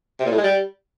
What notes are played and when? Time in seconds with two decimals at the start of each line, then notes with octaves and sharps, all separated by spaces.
0.20 C3
0.26 A#2
0.32 A2
0.38 G#3
0.44 G3